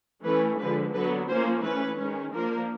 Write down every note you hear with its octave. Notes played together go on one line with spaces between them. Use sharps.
E3 A3 C#4 B4
D3 F3 G#3 B4
D3 F#3 B3 B4
F3 A#3 C#4 C5
E3 A3 C#4 B4
D#3 G#3 C#4
F3 A#3 D4 A#4